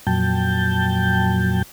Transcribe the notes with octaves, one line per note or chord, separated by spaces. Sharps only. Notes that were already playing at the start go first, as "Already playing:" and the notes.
F2 A#2 F#3 G5 A5 G6